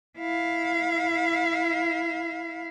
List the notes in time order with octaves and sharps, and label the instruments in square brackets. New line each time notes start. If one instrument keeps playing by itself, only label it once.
[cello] E4 F5